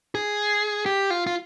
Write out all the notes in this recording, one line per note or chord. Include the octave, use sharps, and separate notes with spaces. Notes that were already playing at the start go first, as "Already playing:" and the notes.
G#4
G4
F4
F4